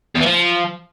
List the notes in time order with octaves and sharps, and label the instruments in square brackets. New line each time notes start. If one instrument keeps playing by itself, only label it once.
[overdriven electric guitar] E2
E3
F3